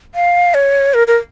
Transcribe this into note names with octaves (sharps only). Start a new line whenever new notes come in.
F5
C#5
A#4
A#4